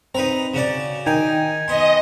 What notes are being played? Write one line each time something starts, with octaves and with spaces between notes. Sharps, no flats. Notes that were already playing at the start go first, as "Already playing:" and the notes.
C4 D#4 B4 A#5
C#3 F#4 D5
D#3 D#4 G5 G#5
B3 D#5 C6